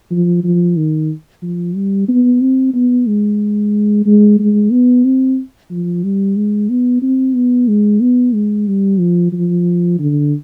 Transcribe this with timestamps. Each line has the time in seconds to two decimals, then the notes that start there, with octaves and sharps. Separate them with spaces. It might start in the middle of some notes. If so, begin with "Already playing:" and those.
0.11 F3
0.44 F3
0.77 D#3
1.42 F3
1.76 G3
2.09 B3
2.41 C4
2.74 B3
3.07 G#3
4.06 G#3
4.39 G#3
4.72 B3
5.05 C4
5.71 F3
6.04 G3
6.37 G#3
6.70 B3
7.02 C4
7.35 B3
7.68 G#3
8.01 B3
8.34 G#3
8.68 G3
9.00 F3
9.33 F3
9.99 D3